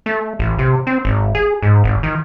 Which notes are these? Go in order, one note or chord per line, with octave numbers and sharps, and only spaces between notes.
A3
A1
C3
C4
G#1
G#4
G#2
G#1
D#3